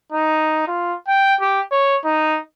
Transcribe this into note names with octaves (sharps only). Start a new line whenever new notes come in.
D#4
F4
G5
G4
C#5
D#4